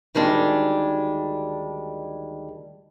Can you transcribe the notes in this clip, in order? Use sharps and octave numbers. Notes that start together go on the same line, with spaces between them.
D2 D#3 G3 G#3 D4